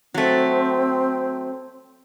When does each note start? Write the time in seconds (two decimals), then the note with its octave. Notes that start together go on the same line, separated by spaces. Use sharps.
0.14 F#3 A3 C4